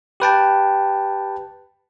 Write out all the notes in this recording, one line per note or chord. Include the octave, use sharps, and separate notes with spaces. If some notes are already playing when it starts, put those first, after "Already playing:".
G4 B4 G5 A5